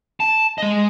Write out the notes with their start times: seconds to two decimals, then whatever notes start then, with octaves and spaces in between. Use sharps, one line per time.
0.20 A5
0.58 G#3 D#5